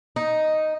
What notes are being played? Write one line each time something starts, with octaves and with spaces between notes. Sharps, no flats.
D#4